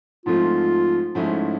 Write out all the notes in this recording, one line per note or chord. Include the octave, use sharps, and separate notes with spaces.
G#2 F3 A3 C4 F4
G#2 F3 A3 C#4 E4